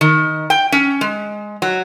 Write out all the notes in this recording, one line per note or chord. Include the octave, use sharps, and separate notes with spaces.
D#3
G5
C#4
G#3
F#3